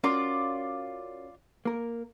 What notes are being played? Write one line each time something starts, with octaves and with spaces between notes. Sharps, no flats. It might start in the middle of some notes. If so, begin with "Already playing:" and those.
C#4 F4 F#4 A#4 D5
A#3 A#4